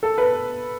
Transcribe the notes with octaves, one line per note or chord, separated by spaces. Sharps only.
A4
B4